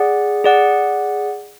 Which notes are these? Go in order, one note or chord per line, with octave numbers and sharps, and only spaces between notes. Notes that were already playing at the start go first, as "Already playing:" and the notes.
Already playing: G#4 D5 F#5
G#4 D5 F#5